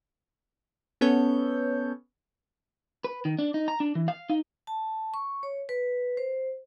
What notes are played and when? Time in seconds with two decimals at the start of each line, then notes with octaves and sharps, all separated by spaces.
1.01 B3 C#4 A4 C#5 G6
3.04 B4
3.25 D#3
3.39 D4
3.54 D#4
3.68 A#5
3.80 D4
3.95 E3
4.08 F5
4.29 D#4
4.67 A5
5.14 C#6
5.43 C#5
5.69 B4
6.17 C5